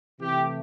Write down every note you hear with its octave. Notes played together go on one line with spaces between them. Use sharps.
C3 E3 A3 G4